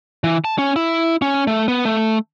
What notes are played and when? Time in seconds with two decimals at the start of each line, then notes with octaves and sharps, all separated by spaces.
0.24 E3
0.45 A5
0.58 C#4
0.76 E4
1.22 C#4
1.47 A3
1.68 B3
1.85 A3